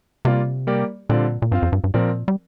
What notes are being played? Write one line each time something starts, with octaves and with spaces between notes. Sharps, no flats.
C3 G3 A#3 F4 D5 F5
G3 A#3 G4 A#4 D5
A#2 D3 G3 C4 F4 D5
A#2
G2 C4 F4 C5 F5
F2
G2
G2
A#2 F3 C4 A#4 D5
G3